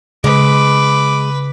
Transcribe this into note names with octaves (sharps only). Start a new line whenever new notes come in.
C#3 G#3 B4 D6